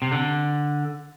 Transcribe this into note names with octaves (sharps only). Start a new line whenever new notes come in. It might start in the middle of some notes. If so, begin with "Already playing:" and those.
C3
D3